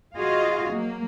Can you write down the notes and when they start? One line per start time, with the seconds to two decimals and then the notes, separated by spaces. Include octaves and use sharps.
0.17 F4 F#4 G#4 D#5 F5
0.75 F#3 A#3